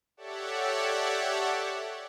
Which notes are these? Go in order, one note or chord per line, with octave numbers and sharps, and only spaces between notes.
G4 A4 C#5 D5 E5 F#5